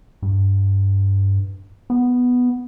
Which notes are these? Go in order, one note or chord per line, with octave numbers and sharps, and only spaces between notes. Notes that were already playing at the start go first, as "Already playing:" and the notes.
G2
B3